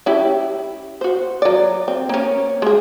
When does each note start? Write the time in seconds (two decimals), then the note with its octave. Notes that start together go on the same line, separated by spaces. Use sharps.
0.06 C#4 E4 G4
1.01 F#4 C5
1.42 F#3 D5
1.88 C4
2.09 A#3 C#4
2.62 G#3 G#4